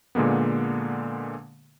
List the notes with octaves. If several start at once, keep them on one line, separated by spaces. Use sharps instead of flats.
A#2 D3 G#3 A#3 B3